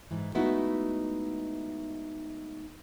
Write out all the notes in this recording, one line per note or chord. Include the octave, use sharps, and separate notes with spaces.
G#2 E3
G#3 A3 B3 D#4 E4 F#4